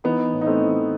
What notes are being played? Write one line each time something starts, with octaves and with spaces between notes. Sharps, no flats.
E3 B3 D#4
A2
D#4
A3 C4
E3